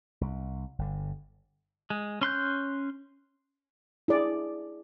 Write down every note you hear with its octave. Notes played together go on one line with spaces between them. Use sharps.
C2
G1 D3
G#3
C#4 C6 F#6 G6
E4 G#4 D5